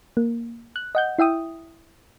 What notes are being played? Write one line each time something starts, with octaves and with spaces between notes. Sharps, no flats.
A#3
F#6
D#5 F#5 G6
E4 E5 G5 D#6